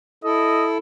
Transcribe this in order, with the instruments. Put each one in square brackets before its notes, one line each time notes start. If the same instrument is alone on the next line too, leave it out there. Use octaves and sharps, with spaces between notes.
[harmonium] E4 A4 [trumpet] D#5